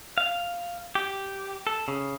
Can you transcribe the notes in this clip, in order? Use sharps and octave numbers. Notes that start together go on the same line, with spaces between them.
F5
G4
A4
C#3